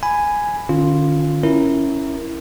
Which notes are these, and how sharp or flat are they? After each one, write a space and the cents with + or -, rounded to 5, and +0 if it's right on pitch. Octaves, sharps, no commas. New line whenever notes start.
G#5 +0 B5 +10
D3 +40 C#4 +0 F4 +0
C#4 +0 E4 +0 A#4 +0